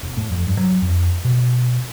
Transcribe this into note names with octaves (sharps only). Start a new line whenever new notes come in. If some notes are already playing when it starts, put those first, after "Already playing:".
E1
A2
F2
G2
F#3
F2
B2